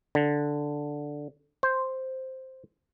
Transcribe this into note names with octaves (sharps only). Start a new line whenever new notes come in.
D3
C5